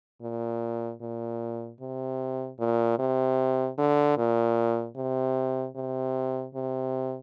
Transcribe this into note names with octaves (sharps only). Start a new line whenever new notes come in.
A#2
A#2
C3
A#2
C3
D3
A#2
C3
C3
C3